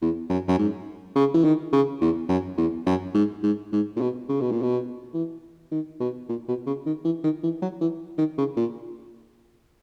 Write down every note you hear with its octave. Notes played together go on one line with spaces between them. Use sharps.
E2
F#2
F#2
G#2
C#3
E3
D#3
C#3
E2
F#2
E2
F#2
G#2
G#2
G#2
A#2
B2
C#3
B2
A#2
B2
E3
D#3
B2
A#2
B2
C#3
D#3
E3
D#3
E3
F#3
E3
D#3
C#3
A#2